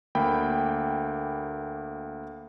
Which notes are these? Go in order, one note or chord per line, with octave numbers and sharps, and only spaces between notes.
D2 A#3 G5 B5